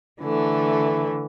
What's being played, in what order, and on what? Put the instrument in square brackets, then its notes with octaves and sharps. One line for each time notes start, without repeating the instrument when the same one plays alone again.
[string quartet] D3 E3 A3